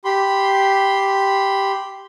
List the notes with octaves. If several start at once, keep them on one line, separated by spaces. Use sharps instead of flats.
G4 B5 C6